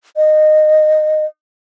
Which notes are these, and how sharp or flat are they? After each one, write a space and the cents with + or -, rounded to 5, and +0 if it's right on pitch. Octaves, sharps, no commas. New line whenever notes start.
D#5 -15